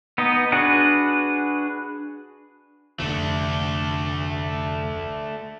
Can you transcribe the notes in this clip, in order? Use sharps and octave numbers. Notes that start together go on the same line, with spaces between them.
B3 D#4 D#5
D4 F#4 G#4 B4 F#5
F1 D2 A3 D4